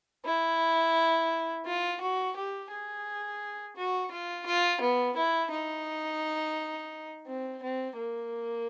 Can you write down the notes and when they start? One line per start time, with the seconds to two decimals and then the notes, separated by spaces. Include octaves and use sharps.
0.25 E4
1.66 F4
2.01 F#4
2.36 G4
2.71 G#4
3.77 F#4
4.11 F4
4.46 F4
4.81 B3
5.17 E4
5.51 D#4
7.27 C4
7.63 C4
7.97 A#3